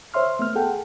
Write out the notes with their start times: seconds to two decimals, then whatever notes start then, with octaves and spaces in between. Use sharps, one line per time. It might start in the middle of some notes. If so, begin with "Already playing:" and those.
0.14 C5 C#5 E5 C6 F6
0.39 A3 B3 F6
0.55 G#4 A4 F#5 G5